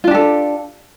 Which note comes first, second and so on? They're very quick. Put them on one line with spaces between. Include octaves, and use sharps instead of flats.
F4 D4 G4 A4